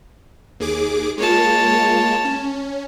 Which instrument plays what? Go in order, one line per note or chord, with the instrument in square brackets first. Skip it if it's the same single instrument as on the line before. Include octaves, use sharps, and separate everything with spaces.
[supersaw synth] D#2 G#4 D6
[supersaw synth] G#3 A#3 F4 [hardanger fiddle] C#5 A5
[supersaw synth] C#4